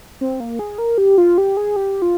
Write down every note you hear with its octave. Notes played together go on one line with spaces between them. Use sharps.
C4
A#3
G#4
A#4
G4
F4
G4
G#4
G4
F4